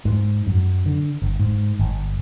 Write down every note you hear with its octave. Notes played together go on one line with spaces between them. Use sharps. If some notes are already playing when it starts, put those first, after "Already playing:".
G#2
F#2
D3
G1
G#2
G1